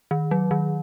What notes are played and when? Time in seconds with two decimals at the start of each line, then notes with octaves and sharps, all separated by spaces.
0.11 D#3
0.31 F#3
0.51 D#3